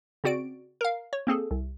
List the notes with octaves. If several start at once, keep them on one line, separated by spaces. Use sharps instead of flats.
C#3 C4 F#4 D5 D7
A#4 F5
C#5
A#3 C4 G#4 A4
C2